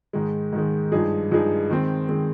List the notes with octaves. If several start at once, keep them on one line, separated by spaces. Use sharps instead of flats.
G#2 D#3 G#3
G#2 D#3 G#3
G2 F3 G#3 D#4 G#4
G2 F3 G#3 D#4 G#4
D#3 G#3 C4
D#3 G#3 C4